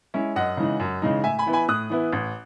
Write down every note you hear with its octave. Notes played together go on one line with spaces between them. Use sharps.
G#3 C#4 E4
F#2 D#5 F#5
C#3 E3 G#3 D#4
F#2
C#3 E3 G#3 D#4
A2 E5 G#5
G#5 B5
E3 B3 E4
G#5 B5
A2 D#6 F#6
E3 B3 E4
A1